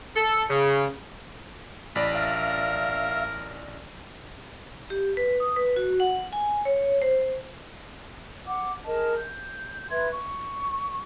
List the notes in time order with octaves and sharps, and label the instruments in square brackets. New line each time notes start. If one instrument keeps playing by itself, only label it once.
[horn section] A4
C#3
[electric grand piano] A1 D5 [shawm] B5
[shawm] A#4 [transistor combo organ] E5 F5
[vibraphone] G4
B4
D#6
B4
F#4
F#5
G#5
C#5
C5
[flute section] F#5 D6
G#4 A#4 D#5 A5
G6
B4 E5 C6 G#6
C#6